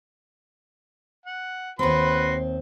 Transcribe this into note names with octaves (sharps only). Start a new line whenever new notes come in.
F#5
D#2 C4 F#4 B4 C6